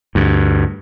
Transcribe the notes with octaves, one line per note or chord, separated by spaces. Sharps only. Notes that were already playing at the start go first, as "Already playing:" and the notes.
D2 G2